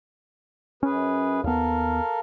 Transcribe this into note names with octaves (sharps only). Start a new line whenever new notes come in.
F#2 C#4 G#4 B4
D#2 B3 A4 A#4 F5